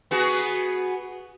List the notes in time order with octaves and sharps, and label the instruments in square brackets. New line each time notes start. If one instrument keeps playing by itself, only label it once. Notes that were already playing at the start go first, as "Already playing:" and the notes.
[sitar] B3 F#4 G#4